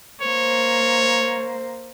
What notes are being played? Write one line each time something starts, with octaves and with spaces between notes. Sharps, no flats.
A#3 C5 C#5